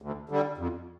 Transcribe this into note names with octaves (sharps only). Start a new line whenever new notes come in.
D2
D3 G3
F2